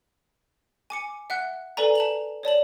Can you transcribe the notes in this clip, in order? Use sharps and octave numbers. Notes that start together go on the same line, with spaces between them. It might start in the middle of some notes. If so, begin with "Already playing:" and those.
G#5 D6 C#7
E5 F#5 F#6
A4 B4 D5 G#5 A#5
A5 F7 F#7
C#5 D5 A5 F#7